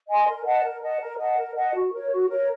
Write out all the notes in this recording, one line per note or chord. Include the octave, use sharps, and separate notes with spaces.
D#5 G#5 C6
A#4
D#5 F#5 A5
A#4
D#5 F#5 A5
A#4
D#5 F#5 A5
A#4
D#5 F#5 A5
F#4
A#4 C#5
F#4
A#4 C#5